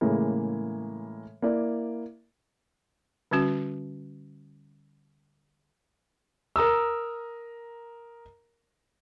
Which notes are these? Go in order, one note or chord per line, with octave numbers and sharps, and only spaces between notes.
A2 C#3 E3 G#3 A#3
A#3 E4 D5
D3 G3 C#4 F#4
A#4 A#5 D#6 E6